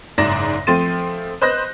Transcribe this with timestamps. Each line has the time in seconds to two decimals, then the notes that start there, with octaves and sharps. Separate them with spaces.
0.18 F#1 G#2 D5 A#6 E7
0.67 F3 A3 C4 C6 A6 D#7
1.41 B4 C5 D#5 F#6 G6 A#6